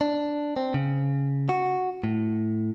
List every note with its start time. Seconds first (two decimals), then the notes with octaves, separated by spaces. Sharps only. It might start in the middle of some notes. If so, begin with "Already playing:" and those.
0.01 D4
0.56 C4
0.74 C#3
1.49 F#4
2.04 A2